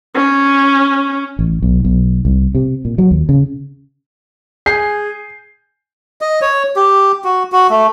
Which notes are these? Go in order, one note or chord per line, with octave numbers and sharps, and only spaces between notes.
C#4
A1
B1
B1
C2
C3
A#2
F#3
D#2
C#3
G#4 G#5 G6 C7
D#5
C#5
G4
F#4
F#4
A3